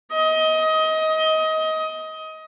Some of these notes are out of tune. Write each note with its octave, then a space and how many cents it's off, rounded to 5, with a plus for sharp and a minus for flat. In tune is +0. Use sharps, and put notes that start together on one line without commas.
D#5 +25